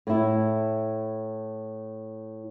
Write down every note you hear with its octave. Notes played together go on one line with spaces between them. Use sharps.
A2 E4